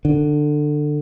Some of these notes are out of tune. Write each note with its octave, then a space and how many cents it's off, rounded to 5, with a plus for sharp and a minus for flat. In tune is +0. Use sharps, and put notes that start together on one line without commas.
D3 +20